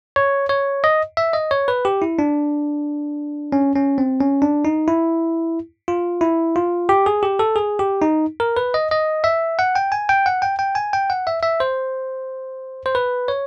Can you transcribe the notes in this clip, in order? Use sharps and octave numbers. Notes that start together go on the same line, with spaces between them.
C#5
C#5
D#5
E5
D#5
C#5
B4
G4
E4
D4
C#4
C#4
C4
C#4
D4
D#4
E4
F4
E4
F4
G4
G#4
G4
A4
G#4
G4
D#4
A#4
B4
D#5
D#5
E5
F#5
G5
G#5
G5
F#5
G5
G5
G#5
G5
F#5
E5
E5
C5
C5
B4
C#5